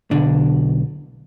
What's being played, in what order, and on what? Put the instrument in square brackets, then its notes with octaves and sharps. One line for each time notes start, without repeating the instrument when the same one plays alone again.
[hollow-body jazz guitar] B1 D3 D4